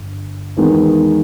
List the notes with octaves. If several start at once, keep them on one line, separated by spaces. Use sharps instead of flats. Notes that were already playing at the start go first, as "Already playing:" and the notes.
Already playing: G1 G2
E2 D#3 G#3 B3